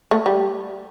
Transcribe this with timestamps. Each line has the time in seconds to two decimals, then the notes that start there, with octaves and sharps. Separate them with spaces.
0.11 A3
0.26 G3